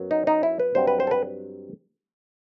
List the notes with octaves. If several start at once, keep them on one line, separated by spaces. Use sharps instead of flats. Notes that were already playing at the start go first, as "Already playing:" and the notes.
Already playing: F#2 F#3 B3
D#4
D#4
E4
B4
G2 F#3 C4 C5
B4
C5
A4
B4